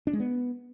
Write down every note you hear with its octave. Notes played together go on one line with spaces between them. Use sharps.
D4
G#3
B3